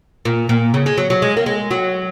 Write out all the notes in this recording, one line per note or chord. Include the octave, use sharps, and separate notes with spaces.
A#2
A#2
C#3
G#3
F#3
F#3
G#3
A#3
G#3
F#3